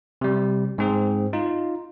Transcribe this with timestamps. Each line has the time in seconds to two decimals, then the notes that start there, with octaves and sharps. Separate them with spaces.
0.21 C3 G3
0.78 G#2 C4 G#4
1.33 D#4 F4